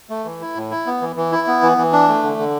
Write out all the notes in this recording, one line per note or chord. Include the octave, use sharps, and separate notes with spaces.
A3
E3
E4
A2
E4
B3
E3
E3
E4
B3
E3
E3
D4
A3
D3
D3